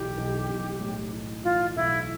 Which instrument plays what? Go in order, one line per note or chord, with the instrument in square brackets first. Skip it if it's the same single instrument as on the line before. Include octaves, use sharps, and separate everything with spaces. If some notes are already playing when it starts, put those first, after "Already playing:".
Already playing: [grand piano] B1 E3 [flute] G4
[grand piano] B1
B1
A2
E3
[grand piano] E3 [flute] F4
[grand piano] B1 [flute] E4